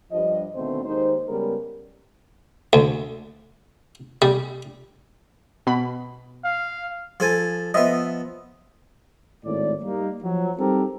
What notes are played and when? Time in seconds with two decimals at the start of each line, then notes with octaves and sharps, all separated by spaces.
0.11 G2 F3 D#5
0.54 D2 B2 D#3 A3 C4 C5
0.85 D#2 G#3 A#3 D#4 C5
1.28 C#3 G3 G#3 B3 A#4
2.73 D2
4.22 G3
5.67 B2 B5
6.44 F5
7.20 F3 A4 G#5
7.74 F3 B3 D#5 E5
9.45 G#1 A2 A#3 D5
9.83 G3 A#3 D#4
10.23 F3 F#3
10.59 G3 C4 D#4 G4 A4 A#4